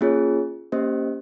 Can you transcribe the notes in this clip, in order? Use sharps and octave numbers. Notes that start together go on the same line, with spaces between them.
A#3 C#4 F4 G#4 C#5
A#3 C#4 G4 C5 D#5